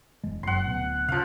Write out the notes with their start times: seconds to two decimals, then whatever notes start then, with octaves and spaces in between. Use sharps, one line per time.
0.24 E1 G#3
0.43 F#1 F#5 C6
0.65 D1 B2
1.08 C#3 F3 F5